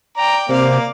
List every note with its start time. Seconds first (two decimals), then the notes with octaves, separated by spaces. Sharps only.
0.17 D5 G5 A#5
0.49 C3 A#3 C5 D5 F5